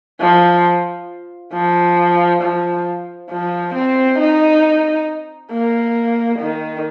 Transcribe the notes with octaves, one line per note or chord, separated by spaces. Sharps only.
F3
F3
F3
F3
C4
D#4
A#3
D#3